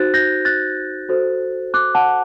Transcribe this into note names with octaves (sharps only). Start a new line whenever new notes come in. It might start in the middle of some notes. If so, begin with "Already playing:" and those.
Already playing: D#4 F#4 C5 F#6 A6
G6 A#6
F#6 A6
F#4 A4 C5
D6 F#6
F#5 A5